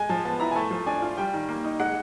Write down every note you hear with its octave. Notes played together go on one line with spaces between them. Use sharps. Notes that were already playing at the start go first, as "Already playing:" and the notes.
Already playing: G#3 G#5
F3 A5
B3 A5
E4 A#5
G#5
A3 A5
F3
D4 G#5
F4
G3 G5
D#3
A#3
D#4
G#3 F#5